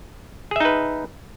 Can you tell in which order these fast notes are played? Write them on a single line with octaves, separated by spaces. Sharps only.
G#4 E5 D#4 B4